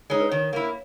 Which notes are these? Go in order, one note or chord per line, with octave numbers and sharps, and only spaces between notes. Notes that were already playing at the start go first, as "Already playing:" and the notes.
G#3 D#4 C#5
B4
D#3 C#5
A#3 E4